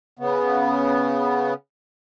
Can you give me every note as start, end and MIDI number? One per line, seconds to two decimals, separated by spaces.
0.19 1.54 49
0.19 1.54 59